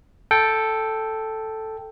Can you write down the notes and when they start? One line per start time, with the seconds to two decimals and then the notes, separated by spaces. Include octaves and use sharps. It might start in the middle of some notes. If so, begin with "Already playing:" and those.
0.31 A4 G5